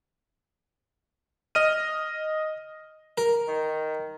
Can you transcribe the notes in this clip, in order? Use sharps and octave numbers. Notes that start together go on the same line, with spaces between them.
D#5 F6 D#7
A#4
D#3